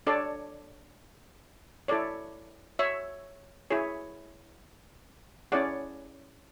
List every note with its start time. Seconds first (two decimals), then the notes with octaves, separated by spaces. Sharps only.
0.07 D4 A4 C#5 D5
1.88 E4 A4 C#5 D5
2.79 C#5 E5
3.70 E4 G#4 C#5
5.52 C#4 E4 G#4 C#5 D5 F#5